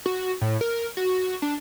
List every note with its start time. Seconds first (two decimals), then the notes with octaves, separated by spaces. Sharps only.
0.06 F#4
0.41 A2
0.61 A#4
0.97 F#4
1.42 D4